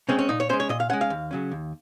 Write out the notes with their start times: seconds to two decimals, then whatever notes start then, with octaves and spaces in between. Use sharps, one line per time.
0.09 C#3 G#3 C4 C#4
0.19 C#4
0.29 A#2 D#4
0.40 C#5
0.49 G#3 C#4 C5
0.60 C#5
0.69 A#2 D#5
0.80 F5
0.90 G#3 C#4 F#5
1.01 F5
1.10 D#2
1.31 C#3 F#3 C#4
1.52 D#2